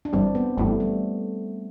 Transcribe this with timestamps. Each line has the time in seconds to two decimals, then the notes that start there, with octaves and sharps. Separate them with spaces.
0.05 D4
0.13 G1 G2 E3 G3 C4
0.35 B3
0.57 G1 G2 E3 G3 A3
0.80 G3